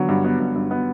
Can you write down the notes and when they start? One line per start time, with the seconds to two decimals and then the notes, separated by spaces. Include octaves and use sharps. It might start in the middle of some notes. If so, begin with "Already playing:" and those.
Already playing: D3 F#3 B3
0.09 G2
0.25 B3
0.40 G2
0.55 G2
0.71 B3